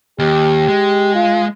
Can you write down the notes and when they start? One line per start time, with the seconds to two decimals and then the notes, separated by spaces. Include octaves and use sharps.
0.19 D#2 G4
0.68 G#3
1.15 F4